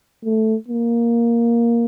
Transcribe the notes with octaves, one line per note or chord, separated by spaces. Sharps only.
A3
A#3